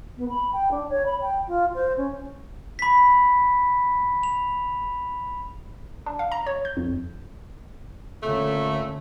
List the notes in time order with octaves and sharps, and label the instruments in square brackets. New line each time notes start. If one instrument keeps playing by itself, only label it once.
[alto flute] B3
B5
G5
D4
C#5
B5
G5
F4
C5
C#4
[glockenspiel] B5 B6
F7
[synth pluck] D4
F5
A#5
C#5
G6
F2
[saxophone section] A#2 A3 [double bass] D3 C#4